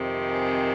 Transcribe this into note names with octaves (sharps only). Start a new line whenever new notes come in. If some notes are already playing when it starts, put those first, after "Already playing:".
Already playing: F2 C3 D#3
G#4